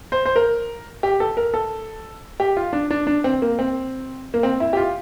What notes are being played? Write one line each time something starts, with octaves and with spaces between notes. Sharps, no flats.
C5
C5
A#4
G4
A4
A#4
A4
G4
F4
D4
D4
D4
C4
A#3
C4
A#3
C4
E4
G4
F4